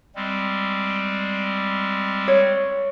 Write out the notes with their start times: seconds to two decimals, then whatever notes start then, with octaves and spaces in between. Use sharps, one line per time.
0.15 G3 G#3 C4
2.28 C#5